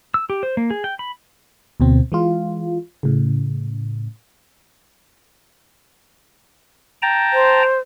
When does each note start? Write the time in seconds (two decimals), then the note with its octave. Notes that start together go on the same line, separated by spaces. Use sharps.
0.14 E6
0.30 G4
0.43 C5
0.57 A#3
0.70 G#4
0.84 G5
0.99 B5
1.80 D2 B2 C4
2.12 E3 G#3 F4
3.03 A2 C#3
7.02 G5 A5 A#5
7.33 C5